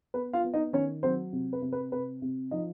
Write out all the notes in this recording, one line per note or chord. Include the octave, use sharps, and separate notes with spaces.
B3 B4
F4 F5
B3
D#4 D#5
D#3 C#4 C#5
F#3 C4 C5
C3
B4
C3
B4
C3 B4
C3
F3 D#4 D#5